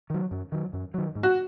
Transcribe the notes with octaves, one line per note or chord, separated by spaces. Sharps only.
D#3 F#3
F#2
D#3 F#3
F#2
D#3 F#3
G#2
F#4